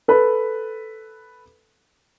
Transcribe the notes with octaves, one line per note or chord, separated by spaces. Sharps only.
A4 B4